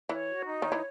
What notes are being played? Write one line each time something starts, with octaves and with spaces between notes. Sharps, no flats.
E3 C#5
F#4
D#4
D#3 C#5
E3